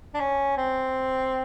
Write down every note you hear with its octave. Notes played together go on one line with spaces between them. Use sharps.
D4
C#4
C4